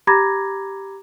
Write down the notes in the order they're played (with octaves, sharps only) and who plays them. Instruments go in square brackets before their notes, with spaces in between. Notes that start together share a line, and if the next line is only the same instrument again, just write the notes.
[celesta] G4 A#5 B5 D6 G#6 A#6